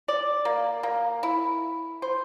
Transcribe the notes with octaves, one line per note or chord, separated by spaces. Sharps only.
D5
A#3
A#3
E4
C5